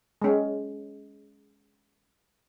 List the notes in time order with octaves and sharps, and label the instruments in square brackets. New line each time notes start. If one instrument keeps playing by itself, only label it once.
[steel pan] G#3 C#4